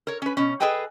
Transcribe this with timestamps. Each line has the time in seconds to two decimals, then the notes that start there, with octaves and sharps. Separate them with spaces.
0.07 A#4 C#5
0.22 C#4 B4
0.37 B2 C#4
0.60 G#4 A4 B4 D#5 G5 G#5